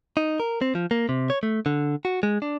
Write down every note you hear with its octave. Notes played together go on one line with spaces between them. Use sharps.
D#4
A#4
C4
F3
A#3
C3
C#5
A3
D3
F#4
G#3
D4